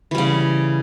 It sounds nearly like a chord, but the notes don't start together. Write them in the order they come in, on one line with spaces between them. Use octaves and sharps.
E3 G3 C#3